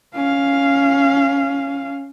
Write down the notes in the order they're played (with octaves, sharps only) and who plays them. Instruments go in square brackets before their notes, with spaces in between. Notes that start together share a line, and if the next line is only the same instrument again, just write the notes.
[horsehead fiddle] C#4 F5